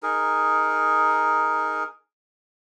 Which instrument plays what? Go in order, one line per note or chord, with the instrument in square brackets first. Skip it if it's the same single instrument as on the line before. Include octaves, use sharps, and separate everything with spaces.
[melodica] D#4 G#4 A#4